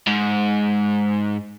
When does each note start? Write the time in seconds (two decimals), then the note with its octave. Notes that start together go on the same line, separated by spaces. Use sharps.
0.07 G#2